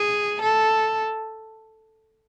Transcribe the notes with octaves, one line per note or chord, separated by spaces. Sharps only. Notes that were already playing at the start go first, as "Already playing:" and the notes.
Already playing: G#4
A4